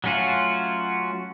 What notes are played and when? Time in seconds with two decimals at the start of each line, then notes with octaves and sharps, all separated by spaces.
0.04 F#3 A3 C#4 F4 F#4